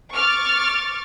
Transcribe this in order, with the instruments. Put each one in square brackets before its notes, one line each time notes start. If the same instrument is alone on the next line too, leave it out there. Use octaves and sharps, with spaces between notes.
[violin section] C#6 D6 F6 A6